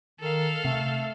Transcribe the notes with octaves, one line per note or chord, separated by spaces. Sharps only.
D#3 A4 F5
C3 A3